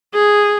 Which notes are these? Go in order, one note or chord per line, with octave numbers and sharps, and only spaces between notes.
G#4